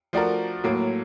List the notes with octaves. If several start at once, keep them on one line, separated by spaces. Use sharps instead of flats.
F3 A3 D4 F#4 A#4
A2 F#3 A#3